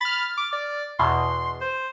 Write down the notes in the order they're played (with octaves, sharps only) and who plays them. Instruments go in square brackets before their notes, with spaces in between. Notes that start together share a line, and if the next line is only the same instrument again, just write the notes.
[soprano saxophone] B5 [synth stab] F6 A6
[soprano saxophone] D6
D5
[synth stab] E2 B2 [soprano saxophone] C6
[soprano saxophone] C5